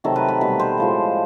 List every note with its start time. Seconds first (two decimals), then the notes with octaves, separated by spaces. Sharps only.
0.04 C3 D#3 F#3 A3 A4
0.16 B4
0.29 B4
0.41 B2 G3 B4
0.60 C5
0.78 A2 F3 G#3